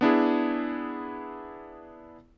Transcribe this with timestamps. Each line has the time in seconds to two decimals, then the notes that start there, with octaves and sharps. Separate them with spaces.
0.01 B3 D4 E4 G#4